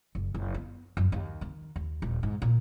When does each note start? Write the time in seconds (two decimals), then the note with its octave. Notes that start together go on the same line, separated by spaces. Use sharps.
0.15 F#1
0.34 F#1
0.54 B3
0.97 F#2
1.12 D#2
1.41 D#3
1.76 D#2
2.02 D#1
2.23 G#2
2.42 A#2